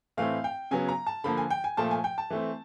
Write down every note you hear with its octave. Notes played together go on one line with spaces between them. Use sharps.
A2 E3 A3 C4 F5
G5
C#3 F#3 B3 G#5
A#5
A5
D3 F3 A#3 B5
G#5
G5
G#5
A#2 F3 A3 A5
G#5
G5
A5
E3 A3 C4